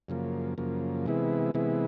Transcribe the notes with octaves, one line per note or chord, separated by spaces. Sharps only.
F#2 C#3 F3 A#3
F#2 C#3 F3 A#3
C3 E3 G#3 B3 E4
C3 E3 G#3 B3 E4